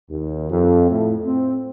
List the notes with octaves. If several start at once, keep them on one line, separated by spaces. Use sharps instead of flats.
D#2
F2
A2
C4